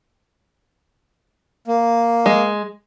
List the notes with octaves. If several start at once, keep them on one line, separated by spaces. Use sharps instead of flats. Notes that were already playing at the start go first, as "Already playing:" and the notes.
A#3
G#3